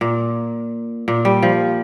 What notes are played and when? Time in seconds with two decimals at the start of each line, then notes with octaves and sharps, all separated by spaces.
0.01 A#2
1.08 A#2
1.25 G3
1.43 F3